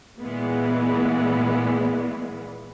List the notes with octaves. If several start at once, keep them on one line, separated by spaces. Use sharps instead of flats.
A#2 E3 G#3 B3